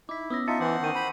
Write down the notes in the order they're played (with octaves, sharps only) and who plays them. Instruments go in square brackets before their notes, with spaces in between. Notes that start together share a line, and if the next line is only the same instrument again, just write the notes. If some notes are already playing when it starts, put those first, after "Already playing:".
[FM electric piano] D#4 [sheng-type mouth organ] E4 [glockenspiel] D6 B6
[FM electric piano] B3 C#4 [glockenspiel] D#6 E6 A#6
[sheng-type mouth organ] D#4 F4 E5 [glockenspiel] A5 A6 C#7
[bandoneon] E3 [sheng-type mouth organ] C5 F#5 [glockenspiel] D6
[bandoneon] D#3 [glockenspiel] C#6 G6 D#7
[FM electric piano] G5 [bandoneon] B5